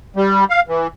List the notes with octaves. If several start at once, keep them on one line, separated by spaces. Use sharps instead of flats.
G3
F5
E3